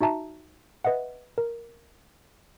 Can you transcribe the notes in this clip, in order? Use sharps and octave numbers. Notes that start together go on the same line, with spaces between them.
D#4 F#4 E5 A5 A#5
B4 D#5 E5 F#5
A#4